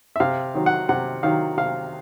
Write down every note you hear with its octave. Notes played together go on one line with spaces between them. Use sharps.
E5
C3 F5
D#3 F#3
F#5
C3 F#5
D#3 F#3 F5
C3 F5